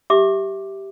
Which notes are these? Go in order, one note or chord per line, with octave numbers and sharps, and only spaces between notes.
G4 E5 D6